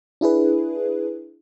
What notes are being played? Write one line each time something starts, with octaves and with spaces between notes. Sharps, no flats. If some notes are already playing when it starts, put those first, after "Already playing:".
D4 E4 G#4 B4